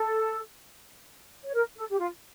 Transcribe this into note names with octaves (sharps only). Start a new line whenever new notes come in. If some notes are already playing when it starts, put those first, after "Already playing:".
Already playing: A4
C#5
A#4
A4
G4
F4